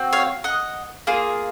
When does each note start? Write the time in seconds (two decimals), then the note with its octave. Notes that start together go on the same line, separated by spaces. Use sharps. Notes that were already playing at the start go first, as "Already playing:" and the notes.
Already playing: C4 F#4
0.13 C#5 F5
0.44 D#5 F#5
1.07 A#3 F4 G#4